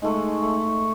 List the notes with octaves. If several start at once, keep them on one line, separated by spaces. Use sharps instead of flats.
G#2 G#3 A3
A3